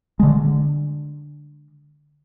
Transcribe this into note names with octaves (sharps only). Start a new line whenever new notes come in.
D3 G#3